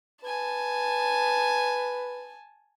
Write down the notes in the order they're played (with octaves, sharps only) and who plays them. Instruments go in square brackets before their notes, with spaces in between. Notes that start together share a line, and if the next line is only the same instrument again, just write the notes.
[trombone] B4 [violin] G#5 A5